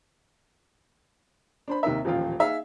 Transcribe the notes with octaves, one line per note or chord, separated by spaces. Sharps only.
D4 C5 B5
D#2 C3 D#4 A#4 E5
D#1 A1 F3 F4 F5 G5
D#4 G#4 E5 F5